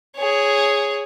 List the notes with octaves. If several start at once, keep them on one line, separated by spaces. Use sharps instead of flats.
G#4 C#5